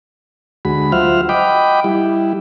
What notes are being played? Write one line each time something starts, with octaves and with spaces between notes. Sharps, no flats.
D2 G#3 F#4 B5
F#3 F4 C5 E5 F#5 F6
D#5 F#5 G5 B5 D6
G3 E4